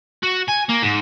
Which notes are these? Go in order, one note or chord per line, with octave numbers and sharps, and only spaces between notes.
F#4
G#5
A#3
G#2